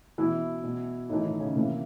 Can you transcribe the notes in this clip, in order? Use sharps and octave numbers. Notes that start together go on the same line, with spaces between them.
B2 E3 E4
B2
A2 D#3 E3 D#4
D#3 D#4
C#3 C#4
C3 E3 A#3